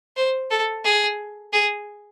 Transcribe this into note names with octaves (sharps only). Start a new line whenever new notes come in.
C5
A4
G#4
G#4